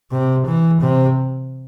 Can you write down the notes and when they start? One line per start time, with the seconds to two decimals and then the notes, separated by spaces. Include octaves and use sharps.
0.12 C3
0.47 E3
0.81 C3